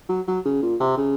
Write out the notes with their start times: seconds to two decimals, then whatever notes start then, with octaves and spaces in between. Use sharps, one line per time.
0.09 F#3
0.28 F#3
0.45 C#3
0.62 A#2
0.80 C3
0.97 C#3